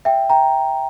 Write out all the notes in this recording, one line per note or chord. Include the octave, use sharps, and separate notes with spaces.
E5 G5
G5 A#5